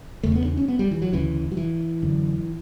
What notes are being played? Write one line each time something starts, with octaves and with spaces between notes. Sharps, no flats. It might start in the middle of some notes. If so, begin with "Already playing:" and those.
E2 C#3 A3
B3
D4
C#4
B3
G3
E3
F#3
D2 C#3 E3
F#3
E3
F#2 D3